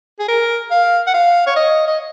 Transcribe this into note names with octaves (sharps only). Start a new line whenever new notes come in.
G#4
A#4
F5
F#5
F5
C#5
D#5
D#5